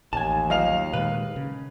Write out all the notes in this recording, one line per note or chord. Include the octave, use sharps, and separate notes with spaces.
A1 D#2 G#5 A5
D#3 F3 F#3 D#5 F5 F7
A#2 D#3 G#3 B4
C#3